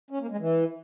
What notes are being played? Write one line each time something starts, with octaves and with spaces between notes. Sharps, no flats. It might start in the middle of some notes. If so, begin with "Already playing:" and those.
C#4
A#3
G#3
E3